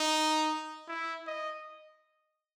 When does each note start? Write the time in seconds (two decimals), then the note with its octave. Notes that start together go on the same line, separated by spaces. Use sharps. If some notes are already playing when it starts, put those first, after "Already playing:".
Already playing: D#4
0.88 E4
1.27 D#5